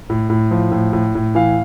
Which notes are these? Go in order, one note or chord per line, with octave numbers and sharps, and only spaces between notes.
A2
A2
F3
A2
A2
A2
E3 F5